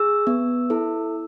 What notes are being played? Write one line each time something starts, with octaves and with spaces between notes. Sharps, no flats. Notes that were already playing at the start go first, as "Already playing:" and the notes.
Already playing: G#4 E6
B3
E4 A4